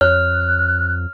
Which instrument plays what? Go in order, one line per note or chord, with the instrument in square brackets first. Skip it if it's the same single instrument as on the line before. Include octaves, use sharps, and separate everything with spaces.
[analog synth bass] F2 [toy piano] C#5 [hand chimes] F6 [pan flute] F#6